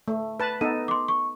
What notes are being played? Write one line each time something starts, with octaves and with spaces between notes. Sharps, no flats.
A3
B4 A5
B3 D#4 A4 D#7
C6 D6
C#6